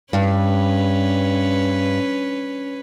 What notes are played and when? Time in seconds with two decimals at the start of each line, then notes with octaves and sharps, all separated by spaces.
0.13 G2 C#4 B4